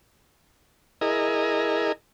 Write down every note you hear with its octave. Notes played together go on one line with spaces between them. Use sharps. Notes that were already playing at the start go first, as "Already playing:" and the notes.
E4 G#4 A#4 D#5